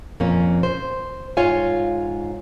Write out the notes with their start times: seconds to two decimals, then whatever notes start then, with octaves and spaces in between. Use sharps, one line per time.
0.20 F2 A#2 A#3 C#4
0.63 C5
1.37 G#2 F4 C#5 F5 G#5